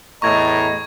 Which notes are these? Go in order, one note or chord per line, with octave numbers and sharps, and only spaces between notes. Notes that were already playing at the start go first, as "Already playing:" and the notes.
E2 A2 D#5 A#5 C#6 G#6